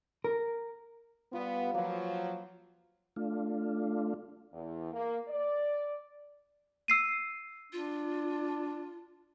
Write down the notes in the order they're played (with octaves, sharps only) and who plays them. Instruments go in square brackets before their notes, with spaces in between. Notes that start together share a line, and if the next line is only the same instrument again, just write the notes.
[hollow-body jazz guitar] A#4
[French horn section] G3 B3 [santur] F4
[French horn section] F3 F#3 [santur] A#3 B4
[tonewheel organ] A3 D4 F4
[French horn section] E2
A#3
D5
[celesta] E6 C7 D#7
[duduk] D4 [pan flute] F4